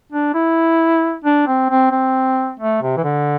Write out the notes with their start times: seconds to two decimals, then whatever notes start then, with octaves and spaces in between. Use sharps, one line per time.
0.12 D4
0.34 E4
1.24 D4
1.47 C4
1.70 C4
1.92 C4
2.59 A3
2.82 C3
2.97 E3
3.04 D3